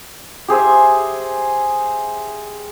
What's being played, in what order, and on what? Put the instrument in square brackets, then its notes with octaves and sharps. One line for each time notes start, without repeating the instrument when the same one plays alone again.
[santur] G4 G#4 C5 E5